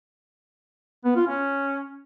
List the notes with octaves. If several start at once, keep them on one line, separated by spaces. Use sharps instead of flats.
B3
F4
C#4